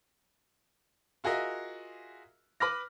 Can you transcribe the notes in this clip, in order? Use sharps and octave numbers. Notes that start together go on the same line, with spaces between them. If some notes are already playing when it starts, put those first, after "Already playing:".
F4 F#4 G#4 A#4 D#5 E5
B4 B5 D6 F6 A#6